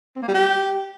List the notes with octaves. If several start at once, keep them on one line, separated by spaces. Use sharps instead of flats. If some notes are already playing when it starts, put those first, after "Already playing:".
C4
A#3
G3
G4